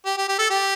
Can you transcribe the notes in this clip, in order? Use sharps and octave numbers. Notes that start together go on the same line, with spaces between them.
G4
G4
G4
A4
G4